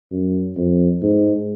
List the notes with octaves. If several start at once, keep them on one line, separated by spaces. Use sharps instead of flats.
F#2
F2
G#2